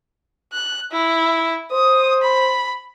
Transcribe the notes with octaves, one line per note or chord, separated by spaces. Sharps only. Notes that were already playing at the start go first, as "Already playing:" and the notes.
F#6
E4
C5 D#6
B5